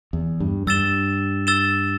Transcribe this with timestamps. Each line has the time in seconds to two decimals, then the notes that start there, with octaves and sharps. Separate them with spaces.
0.13 E2
0.40 G2
0.67 G2 E6 A6 E7 G7
1.47 E6 A6 E7 G7